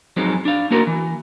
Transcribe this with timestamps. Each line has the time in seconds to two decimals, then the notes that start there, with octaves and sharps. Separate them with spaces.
0.17 F#2 F3 F#3 G#3 C4 D#4
0.45 D4 F5
0.71 A#3 C#4 F#4 A#4
0.87 E3